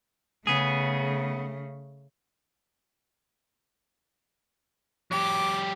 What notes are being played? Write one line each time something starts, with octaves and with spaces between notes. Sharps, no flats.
C#3 A3 B3 G#4
F#3 G4 D6